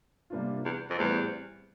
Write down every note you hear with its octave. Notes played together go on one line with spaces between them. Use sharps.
C3 G3 A#3 D4 F4
E2
F2
E2 A2 G3 C4